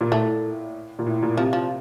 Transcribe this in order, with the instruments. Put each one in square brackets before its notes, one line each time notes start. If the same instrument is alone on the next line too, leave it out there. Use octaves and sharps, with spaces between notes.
[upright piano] A#2
[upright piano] A2 [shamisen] A3
[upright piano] A2
A#2
A2
A#2
[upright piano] C3 [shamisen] F3
[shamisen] F3